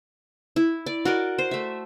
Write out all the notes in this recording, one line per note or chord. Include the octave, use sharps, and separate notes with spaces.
E4
D5
F#4 A#4 D5 D#5
C5
A3 E5